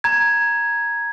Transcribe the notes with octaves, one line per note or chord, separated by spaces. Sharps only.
A#5 G#6